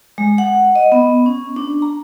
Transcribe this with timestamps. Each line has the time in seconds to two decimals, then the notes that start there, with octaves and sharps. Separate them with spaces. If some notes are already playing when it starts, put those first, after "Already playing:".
0.18 G#3
0.38 F#5
0.75 D#5
0.92 B3
1.26 C#4
1.56 D4
1.82 A#5